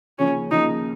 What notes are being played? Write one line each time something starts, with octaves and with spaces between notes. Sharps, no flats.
D#2 C#3 F3 C#4
D#2 C#3 F3 D#4